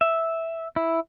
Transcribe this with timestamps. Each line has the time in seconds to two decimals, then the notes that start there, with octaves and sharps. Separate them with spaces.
0.01 E5
0.76 E4